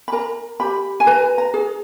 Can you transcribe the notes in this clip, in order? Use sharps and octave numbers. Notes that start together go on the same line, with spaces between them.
B5
A#4 A#5
G4 B5
G#5
B4 A#5
A#5
G#4